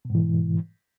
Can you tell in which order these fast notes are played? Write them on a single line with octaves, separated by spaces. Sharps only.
B2 G#2 E3